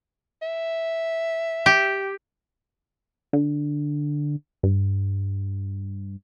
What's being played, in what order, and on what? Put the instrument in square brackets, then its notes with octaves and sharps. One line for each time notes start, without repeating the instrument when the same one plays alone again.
[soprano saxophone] E5
[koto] G4
[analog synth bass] D3
G2